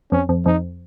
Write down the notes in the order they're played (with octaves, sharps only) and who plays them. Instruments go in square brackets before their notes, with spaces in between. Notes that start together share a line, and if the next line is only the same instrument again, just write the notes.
[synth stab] F2 [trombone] C#4
[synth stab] F2
[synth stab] F2 [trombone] D#4